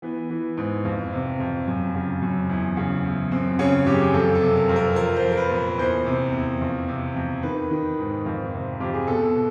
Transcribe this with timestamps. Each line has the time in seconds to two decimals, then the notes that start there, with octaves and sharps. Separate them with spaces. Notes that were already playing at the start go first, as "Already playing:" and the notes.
0.02 E3 B3
0.30 E3
0.57 G#2
0.85 F2
1.13 C3
1.40 F2
1.67 F#2
1.94 C#3
2.22 F#2
2.49 E2
2.77 C#3
3.04 E2
3.31 F#2 C4
3.59 C#3 C#4
3.86 F#2 G4
3.94 G#4
4.01 G4
4.14 F2 A4
4.35 A4
4.42 C3
4.56 A#4
4.69 F2
4.76 A#4
4.96 F3 A#4
5.17 C5
5.24 F3
5.31 A#4
5.37 B4
5.51 A#2
5.58 B4
5.78 E2 C5
6.06 C3
6.34 E2
6.61 F2
6.88 C3
7.16 F2
7.43 D#3 B4
7.71 D#3
7.99 G#2
8.25 F2
8.54 C3
8.80 F2 G4
8.94 G#4
9.07 B2 A4
9.35 B2